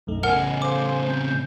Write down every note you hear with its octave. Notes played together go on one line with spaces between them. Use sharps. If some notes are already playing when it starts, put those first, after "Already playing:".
B1 F#2 A3 D#4
A2 C#3 A4 A#4 D#5 F#5 G#5 F6
C5 F5 G#5 D6
C4 G#5 G6